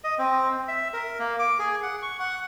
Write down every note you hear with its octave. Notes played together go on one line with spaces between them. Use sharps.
D#5
C4
E5
A#4
A#3
D6
G#4
F#5
C#6
F#5